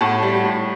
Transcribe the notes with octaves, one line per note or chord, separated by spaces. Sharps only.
A2 F#5 A5
G3
A2